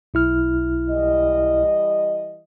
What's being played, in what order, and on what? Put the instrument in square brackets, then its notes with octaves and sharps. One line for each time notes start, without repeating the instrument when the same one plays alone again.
[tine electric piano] B1 E4 F6
[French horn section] E3 G3 D#5